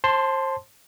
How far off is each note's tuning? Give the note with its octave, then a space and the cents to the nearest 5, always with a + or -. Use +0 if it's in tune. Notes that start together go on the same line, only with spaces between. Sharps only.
C5 +30 A5 +0 C6 -5